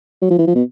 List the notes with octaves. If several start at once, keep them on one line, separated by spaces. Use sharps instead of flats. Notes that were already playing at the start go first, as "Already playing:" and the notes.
F#3
F3
E3
F3
B2